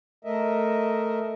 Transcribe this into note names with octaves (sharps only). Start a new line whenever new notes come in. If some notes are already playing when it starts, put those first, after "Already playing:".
A3 A#4 D#5 E5